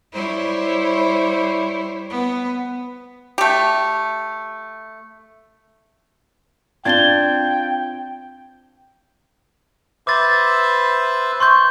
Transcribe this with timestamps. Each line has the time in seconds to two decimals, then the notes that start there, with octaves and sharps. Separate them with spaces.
0.13 G3 E4 C5 C#5
2.10 B3
3.38 A3 G4
6.85 C4 D4 F4 G5 G#6 A6 G7
10.07 B4 C5 E5 D6 A6
11.40 C6 C#6 G6